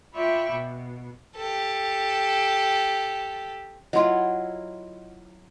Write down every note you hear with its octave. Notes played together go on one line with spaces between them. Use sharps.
F4 D5 E5 G5 B5 C#6
B2
G4 A4
F#3 E4 F4 D#5 C6